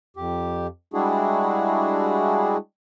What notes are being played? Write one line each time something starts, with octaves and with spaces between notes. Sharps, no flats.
F2 G4
G3 G#3 D4 E4 F#4 G#4